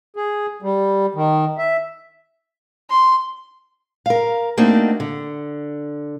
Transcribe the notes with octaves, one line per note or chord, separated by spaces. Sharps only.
G#4
G3
D#3
E5
C6
A#4 F5
A3 A#3 C4 D4 D#4 F#4
D3